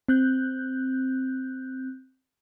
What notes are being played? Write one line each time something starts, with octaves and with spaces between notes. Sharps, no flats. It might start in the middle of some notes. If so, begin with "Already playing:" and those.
C4 F#6 G6